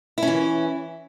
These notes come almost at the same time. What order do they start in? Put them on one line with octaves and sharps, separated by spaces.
E4 C#4 E3